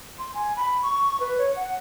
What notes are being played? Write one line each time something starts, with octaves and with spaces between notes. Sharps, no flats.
C6
G#5
B5
C#6
B4
C#5
F#5